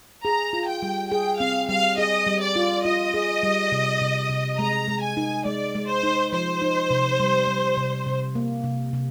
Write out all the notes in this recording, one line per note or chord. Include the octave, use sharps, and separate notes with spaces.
G#4 A#5
F4
G5
G3
G#4 G5
C4 F5
G3 F5
G#4 D#5
G3
D5
F4
F4 D#5
G#4
G3
C3
C3
C3
G#3 A#5
G#3
G#5
D#4
G#3 D5
G#3
C5
D#4
F3 C5
D#4
C3
G3
G3
C3
C3
A#3
C3
C3